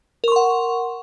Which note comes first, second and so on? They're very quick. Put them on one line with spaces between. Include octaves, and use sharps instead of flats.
A#4 C#6 C6 F#5